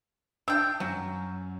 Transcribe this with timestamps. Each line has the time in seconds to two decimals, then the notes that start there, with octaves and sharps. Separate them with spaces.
0.48 D4 G5 E6
0.80 F#2 F#3 C#4